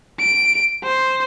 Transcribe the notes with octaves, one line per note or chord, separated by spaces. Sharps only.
D7
C5